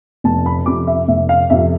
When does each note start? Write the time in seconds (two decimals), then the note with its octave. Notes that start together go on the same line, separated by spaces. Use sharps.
0.24 F1 A5
0.46 B5
0.66 F2 C3 D6
0.87 E5
1.08 F1 E5
1.29 F5
1.50 F2 C3 E5